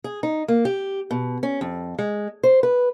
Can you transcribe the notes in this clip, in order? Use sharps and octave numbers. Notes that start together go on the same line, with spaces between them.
G#4
D#4
A#3
G4
B2
C#4
F2
G#3
C5
B4